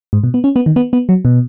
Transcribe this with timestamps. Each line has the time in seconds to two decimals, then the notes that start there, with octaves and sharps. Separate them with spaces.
0.13 G#2
0.24 B2
0.34 B3
0.44 C#4
0.56 B3
0.66 D#3
0.76 B3
0.93 B3
1.09 F#3
1.25 B2